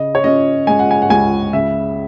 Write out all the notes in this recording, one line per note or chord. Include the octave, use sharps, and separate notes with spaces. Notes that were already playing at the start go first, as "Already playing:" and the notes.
Already playing: C#3 D#5
C#5
C#4 D#5
G#3 G#5
F#5
G#5
F#5
C#2 G#5
C#3 E5